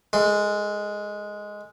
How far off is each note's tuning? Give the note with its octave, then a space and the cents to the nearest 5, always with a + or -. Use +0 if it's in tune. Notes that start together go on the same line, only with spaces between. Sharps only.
G#3 +0 A4 +35